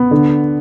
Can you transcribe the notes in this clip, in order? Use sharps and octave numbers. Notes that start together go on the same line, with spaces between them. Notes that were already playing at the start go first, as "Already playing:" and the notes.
Already playing: B3
D3